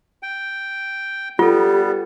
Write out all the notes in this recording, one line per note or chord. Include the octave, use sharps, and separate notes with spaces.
G5
G3 B3 F4 G4 A4